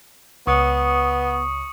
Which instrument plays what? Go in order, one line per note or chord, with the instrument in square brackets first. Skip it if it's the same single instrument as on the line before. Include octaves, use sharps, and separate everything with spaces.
[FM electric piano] C#2 [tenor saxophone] B3 [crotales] C#6 D#6 C#7